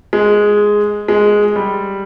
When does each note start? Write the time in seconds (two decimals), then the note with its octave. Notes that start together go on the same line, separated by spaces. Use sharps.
0.13 G#3
1.08 G#3
1.56 G3